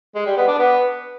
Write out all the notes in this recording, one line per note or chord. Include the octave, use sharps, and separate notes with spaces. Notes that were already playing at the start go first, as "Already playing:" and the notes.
G#3
G3
B3
D4
B3